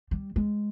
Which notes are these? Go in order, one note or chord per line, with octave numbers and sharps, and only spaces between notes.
G3
G#3